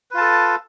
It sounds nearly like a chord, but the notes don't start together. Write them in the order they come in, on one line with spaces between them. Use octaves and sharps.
B4 F4 A5 A4